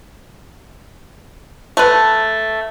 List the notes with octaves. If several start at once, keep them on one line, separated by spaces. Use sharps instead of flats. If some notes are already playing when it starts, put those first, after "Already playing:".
A3 B4